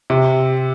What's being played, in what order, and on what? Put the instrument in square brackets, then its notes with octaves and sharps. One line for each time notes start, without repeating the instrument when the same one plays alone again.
[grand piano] C3